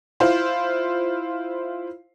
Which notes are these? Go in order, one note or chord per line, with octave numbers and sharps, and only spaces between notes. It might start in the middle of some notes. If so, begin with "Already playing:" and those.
E4 F4 C5 F5